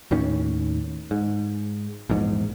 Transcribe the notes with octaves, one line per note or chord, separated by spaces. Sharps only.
D#2 A2 D#3 C#4
G#2
A#1 E2 G#2